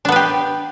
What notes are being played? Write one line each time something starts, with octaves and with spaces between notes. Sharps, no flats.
B3 D4 G4 B4